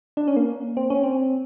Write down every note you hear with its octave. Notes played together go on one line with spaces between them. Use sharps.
D4
C#4
A#3
C4
C#4
C4